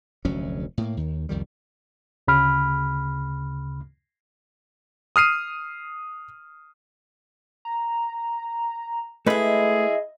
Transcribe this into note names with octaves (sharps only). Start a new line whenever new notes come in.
F1 D2 F#3 C#4
A2 A#3
D#2 D#3
C2 F2 D#3 G3
D2 C#3 B5 F6
D#6 F6 C7 D#7
A#5
G#3 A3 E4 G#4 B4 D#5